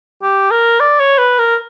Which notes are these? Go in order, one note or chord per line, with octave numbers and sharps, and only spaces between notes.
G4
A#4
D5
C#5
B4
A#4